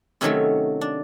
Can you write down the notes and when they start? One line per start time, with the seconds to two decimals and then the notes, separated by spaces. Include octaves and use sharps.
0.21 C3 D#3 F#3 A3 C#4
0.81 D4